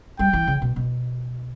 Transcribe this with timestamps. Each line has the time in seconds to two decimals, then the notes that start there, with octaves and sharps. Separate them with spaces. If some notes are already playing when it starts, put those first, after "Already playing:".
0.19 G3 G5
0.33 E3
0.47 C#3
0.62 B2
0.76 B2